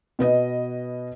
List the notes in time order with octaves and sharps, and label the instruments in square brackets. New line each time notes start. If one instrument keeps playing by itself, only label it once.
[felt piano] B2 B4 D#5